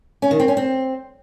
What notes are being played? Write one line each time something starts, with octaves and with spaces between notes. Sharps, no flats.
C#4
D#3
C4
C#4
C4